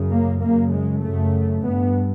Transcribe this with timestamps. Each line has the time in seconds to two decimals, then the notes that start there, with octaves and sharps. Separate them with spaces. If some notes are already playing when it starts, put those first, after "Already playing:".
Already playing: F#2 C#3
0.11 A#3
0.41 F#2 C#3 A#3
0.73 G#3
1.02 F#2 C#3 A3
1.63 G2 B3